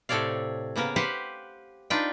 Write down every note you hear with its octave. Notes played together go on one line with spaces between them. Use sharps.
A2 C3 A4 C#5 D5 F5
C#3 A#3 B3 A#4
G4 B4 C5 F5 F#5
D4 D#4 F4 B4 G5